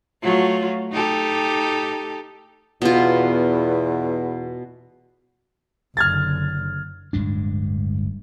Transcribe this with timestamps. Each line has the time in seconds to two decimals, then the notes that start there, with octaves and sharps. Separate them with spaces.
0.22 F#3 A3 F4
0.92 D#4 G4 A4
2.82 E2 B2 F4
5.97 F#1 D3 F6 G#6 A6
7.13 D1 G2 G#3 D4